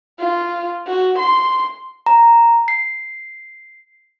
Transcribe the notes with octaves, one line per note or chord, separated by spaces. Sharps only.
F4
F#4
C6
A#5
C7